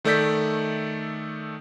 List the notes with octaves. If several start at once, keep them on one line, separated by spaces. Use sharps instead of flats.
D#3 A3 A4 D5 G6 B6